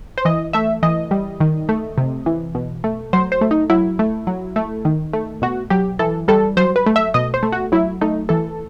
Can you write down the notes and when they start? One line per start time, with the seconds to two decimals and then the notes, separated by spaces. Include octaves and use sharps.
0.18 C5
0.25 E3 D#5
0.53 A3 E5
0.83 E3 D#5
1.11 G3
1.40 D#3
1.69 A3
1.98 C3
2.26 E3
2.55 B2
2.84 A3
3.13 F#3 C5
3.32 C5
3.41 A3
3.51 D#4
3.70 F#3 E4
3.99 A3
4.27 F#3
4.56 A3
4.85 D#3
5.13 A3
5.42 B2 F#4
5.70 F#3 G4
5.99 E3 A4
6.28 G3 A4
6.57 F#3 C5
6.76 B4
6.86 A3
6.96 E5
7.14 B2 D#5
7.34 C5
7.43 A3
7.52 F#4
7.72 F#3 E4
8.01 A3 D#4
8.29 E3 A4